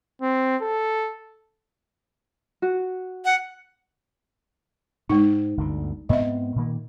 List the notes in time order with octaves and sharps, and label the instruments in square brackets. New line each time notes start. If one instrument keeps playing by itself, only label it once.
[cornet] C4
A4
[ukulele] F#4
[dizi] F#5
[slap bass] G#2 [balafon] G#3 D#4
[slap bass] G1 D2 D3
[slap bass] G#2 B3 C4 [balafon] D#5 E5
[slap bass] A#2 D#3 A#3